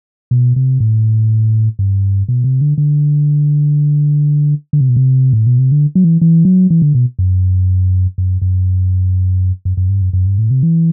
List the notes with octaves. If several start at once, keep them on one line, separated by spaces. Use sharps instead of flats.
B2
C3
A2
G2
B2
C3
D3
D3
D3
C3
B2
C3
A2
B2
C3
D3
F#3
E3
E3
F#3
E3
D3
B2
F#2
F#2
F#2
F#2
F#2
G2
F#2
F#2
G2
A2
C3
E3